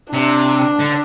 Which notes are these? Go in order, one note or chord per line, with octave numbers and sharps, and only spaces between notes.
C3 D4
D3